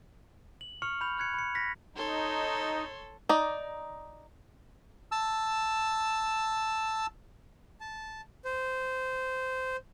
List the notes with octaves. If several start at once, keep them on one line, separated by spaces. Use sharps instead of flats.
F#7
C#6 F6 C#7 F7
B5 G6 F7
F6 F#6 G#6 C#7
B5 C#7
A#6 B6
D#4 A4 C#5 C6
D#4 D5
A5 E6
A5
C5